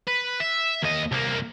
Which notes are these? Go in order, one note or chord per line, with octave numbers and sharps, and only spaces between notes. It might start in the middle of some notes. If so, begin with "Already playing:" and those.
B4
E5
D#2 D#5
C2 A#3